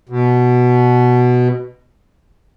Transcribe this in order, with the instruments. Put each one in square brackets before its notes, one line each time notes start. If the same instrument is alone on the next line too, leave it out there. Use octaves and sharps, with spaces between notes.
[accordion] B2